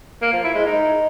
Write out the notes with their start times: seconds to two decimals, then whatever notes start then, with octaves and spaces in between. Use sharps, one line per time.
0.22 A#3
0.33 F3
0.44 E4
0.55 G#3
0.66 D#4